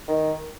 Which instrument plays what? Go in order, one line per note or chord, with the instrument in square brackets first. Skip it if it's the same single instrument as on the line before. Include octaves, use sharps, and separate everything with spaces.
[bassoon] D#3